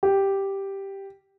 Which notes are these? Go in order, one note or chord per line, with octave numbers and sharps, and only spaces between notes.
G4